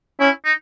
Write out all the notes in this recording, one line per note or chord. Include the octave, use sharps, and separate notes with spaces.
C#4 E4
D#4